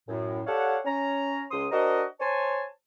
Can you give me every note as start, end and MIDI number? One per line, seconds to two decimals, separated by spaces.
0.08 0.40 42
0.08 0.40 45
0.46 0.77 67
0.46 0.77 69
0.46 0.77 73
0.46 0.77 74
0.46 0.77 77
0.46 0.77 78
0.85 1.43 61
0.85 1.43 82
1.51 1.65 37
1.51 1.65 84
1.51 1.65 87
1.71 2.03 62
1.71 2.03 66
1.71 2.03 70
1.71 2.03 72
1.71 2.03 75
2.20 2.63 72
2.20 2.63 73
2.20 2.63 80
2.20 2.63 81